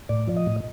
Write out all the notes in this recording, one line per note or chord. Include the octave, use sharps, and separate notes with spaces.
A2 D5
F3
D#5
A2